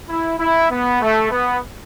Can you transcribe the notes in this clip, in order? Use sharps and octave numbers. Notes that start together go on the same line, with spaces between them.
E4
E4
B3
A3
B3